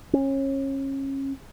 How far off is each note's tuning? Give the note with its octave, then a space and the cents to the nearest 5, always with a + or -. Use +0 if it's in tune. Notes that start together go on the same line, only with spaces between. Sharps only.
C#4 -30